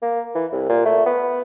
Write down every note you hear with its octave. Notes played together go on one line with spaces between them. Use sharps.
A#3
E3
C2
A#2
A3
B3